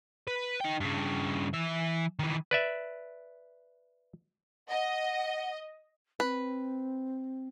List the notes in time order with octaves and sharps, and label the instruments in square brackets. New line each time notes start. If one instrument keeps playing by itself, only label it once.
[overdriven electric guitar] B4
D#4 G5
G2 C#3
E3 E5
D#3 E3
[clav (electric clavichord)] B4 D5 E5
[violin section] D#5 [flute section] F#5
[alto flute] C4 [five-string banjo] B4